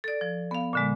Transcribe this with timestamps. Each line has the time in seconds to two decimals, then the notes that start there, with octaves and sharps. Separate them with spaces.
0.04 A4 D5
0.21 F3
0.51 B3 F5
0.73 A#2 D3 G#3